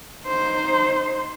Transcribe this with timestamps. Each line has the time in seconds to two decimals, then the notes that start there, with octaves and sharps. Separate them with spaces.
0.24 D#4 C5